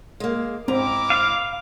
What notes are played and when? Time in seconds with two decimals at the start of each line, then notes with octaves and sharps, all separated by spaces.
0.20 G#3 A#3
0.68 G#2 C4 E4 A#4 A#5 D6
1.10 F5